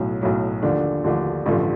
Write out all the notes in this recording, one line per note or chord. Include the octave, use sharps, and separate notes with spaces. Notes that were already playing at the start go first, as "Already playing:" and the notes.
Already playing: B1 A2 F#3
B1 A2 F#3
D#2 D3 F3 A3 D4
D#2 D3 F3 A3 D4
A1 G2 D3 F3 A3